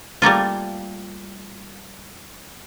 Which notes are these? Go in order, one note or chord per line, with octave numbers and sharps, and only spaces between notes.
G3 A3 A#3 F4